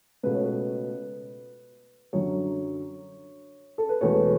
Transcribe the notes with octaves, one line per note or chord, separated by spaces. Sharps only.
C#2 B2 A3 B4
C#5
B4
F#2 D3 F#3 C#5
A4
B4
E1 E2 B2 A3 C#5